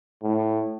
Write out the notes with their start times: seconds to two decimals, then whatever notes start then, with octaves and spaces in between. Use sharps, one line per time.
0.23 A2